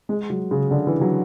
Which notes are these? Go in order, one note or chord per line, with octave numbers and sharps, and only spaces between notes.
G#3
F#3
C#3
D3
E3
F#3